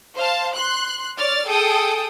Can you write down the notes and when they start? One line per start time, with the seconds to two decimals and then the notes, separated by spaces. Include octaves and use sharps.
0.16 C5 F5 A5
0.54 C6 F#6
1.17 C#5 D5 F6 A6
1.47 G#4 A4 G5 D#6